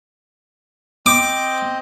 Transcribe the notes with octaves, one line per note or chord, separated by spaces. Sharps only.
C4 C5 D#5 D6